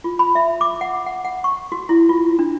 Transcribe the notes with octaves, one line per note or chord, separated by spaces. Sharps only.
F4
B5
E5
D6
F#5
F#5
F#5
C#6
F#4
E4
F4
D4